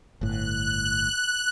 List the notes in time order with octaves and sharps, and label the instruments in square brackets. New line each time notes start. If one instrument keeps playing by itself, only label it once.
[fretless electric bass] G1 A2 [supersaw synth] F#6